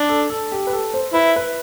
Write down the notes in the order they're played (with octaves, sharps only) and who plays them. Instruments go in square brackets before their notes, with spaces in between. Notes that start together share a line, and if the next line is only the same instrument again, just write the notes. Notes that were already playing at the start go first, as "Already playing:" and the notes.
Already playing: [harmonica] D4
[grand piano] A4
A4
G4
B4
A4
C5
[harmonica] E4 [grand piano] B4
[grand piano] B4